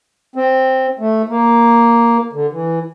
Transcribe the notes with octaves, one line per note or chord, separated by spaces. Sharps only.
C4
A3
A#3
D3
E3